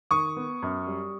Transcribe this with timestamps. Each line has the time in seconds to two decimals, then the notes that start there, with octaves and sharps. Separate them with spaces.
0.11 D#3 C#6 D#6
0.37 B3
0.62 F#2
0.87 G3